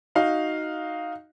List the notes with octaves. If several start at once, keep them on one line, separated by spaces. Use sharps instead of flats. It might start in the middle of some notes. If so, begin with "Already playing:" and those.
D#4 F#4 F5